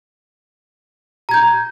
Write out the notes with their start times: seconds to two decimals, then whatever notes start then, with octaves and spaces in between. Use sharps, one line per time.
1.29 A#5
1.31 G#6
1.34 G6